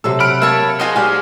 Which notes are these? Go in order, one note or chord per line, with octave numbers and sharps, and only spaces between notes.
C3 F#3 A4 E6
F#5 B5 F6 D7
A#3 C#5 E5 A5
F4 F#4 G#4 C5 D#5
F#4 G4 D5 F5 G#5